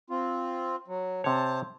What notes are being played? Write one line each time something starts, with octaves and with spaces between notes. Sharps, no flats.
C4 F4
F#3
C3 C5 C#5 A5